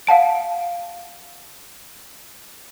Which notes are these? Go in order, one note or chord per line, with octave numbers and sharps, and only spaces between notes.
F5 F#5 A5 D7